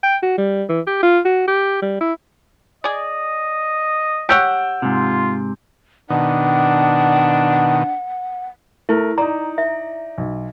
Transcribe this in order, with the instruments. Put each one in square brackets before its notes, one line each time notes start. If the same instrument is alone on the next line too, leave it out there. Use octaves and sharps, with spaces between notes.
[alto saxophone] G5
F#4
G3
E3
G4
F4
F#4
G4
G3
E4
[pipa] G#4 D5 [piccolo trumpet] D#5
[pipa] G4 C#5 F#5 [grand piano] E6 G6 D7
[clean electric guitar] G#2 C3 [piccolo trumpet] F4
[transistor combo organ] B2 D#3 [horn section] D4 [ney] F#5
[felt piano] A3 A#4 [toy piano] E4
[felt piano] D#4 D5 [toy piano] A#5
[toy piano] E5
[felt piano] B1